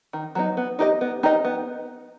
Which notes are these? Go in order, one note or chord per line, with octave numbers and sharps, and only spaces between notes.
D#3
F#3 B3 D#4
B3
D#4 G4 A#4 D#5
B3
D#4 G4 A#4 D#5
B3